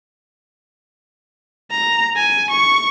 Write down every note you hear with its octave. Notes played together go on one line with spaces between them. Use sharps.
A#5
G#5
C#6